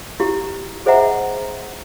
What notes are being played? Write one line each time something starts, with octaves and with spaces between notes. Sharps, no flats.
E4 G4
G#4 C5 D#5 E5 F#5 A#5